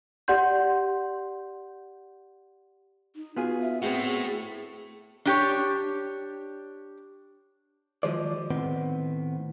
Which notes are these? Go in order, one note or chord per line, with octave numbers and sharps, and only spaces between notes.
G4 D5 F#5 C6 G6
D#4
B3 F4 F#4 G#4
E5
A2 B3 C4 F#4 G#4
D4 G4 C#5
D#3 F3 F#3 G#3 C5 D5
A2 D#3 B3 C4